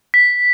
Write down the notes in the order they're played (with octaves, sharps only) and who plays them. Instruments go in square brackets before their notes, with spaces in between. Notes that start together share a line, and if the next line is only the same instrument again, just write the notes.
[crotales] B6